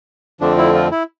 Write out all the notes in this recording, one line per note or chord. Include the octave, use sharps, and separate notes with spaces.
F2 D3 F3 A3 C4 D4
E4
F4
E4